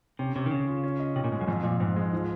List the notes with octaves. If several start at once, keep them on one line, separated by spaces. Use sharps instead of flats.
C3 C#4
C3 C#4
D#3
C#3 C#4
F4
C#4
D#5
C3 C#4
A#2
G#2 G#3
F#2
F2 G#2
F2 A#2
F2 G#2
G#3
F3